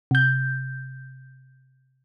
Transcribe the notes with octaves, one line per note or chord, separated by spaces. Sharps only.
C3 G6